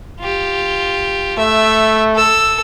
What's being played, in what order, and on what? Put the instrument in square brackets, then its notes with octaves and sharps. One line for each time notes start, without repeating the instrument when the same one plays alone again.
[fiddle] F4 G4
[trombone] A3 [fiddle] E5
[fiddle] A4 E6